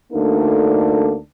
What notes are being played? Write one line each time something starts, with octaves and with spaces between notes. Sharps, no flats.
D2 A#3 D4 D#4 A4